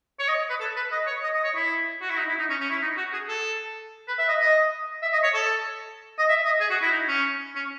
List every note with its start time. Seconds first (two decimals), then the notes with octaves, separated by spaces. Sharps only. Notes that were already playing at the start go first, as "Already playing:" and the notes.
0.19 C#5
0.28 D#5
0.49 B4
0.60 A4
0.76 B4
0.92 D#5
1.07 C#5
1.23 D#5
1.34 D#5
1.44 C#5
1.55 E4
2.01 F#4
2.10 E4
2.18 D#4
2.28 E4
2.39 D#4
2.50 C#4
2.61 C#4
2.70 E4
2.81 D#4
2.97 F#4
3.13 G#4
3.29 A4
4.08 B4
4.18 E5
4.28 D#5
4.40 D#5
5.03 E5
5.13 D#5
5.24 C#5
5.34 A4
6.19 D#5
6.29 E5
6.45 D#5
6.60 G#4
6.70 F#4
6.82 E4
6.92 D#4
7.08 C#4
7.55 C#4